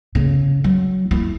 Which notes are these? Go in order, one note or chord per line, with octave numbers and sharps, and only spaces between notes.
C#3
F#3
E4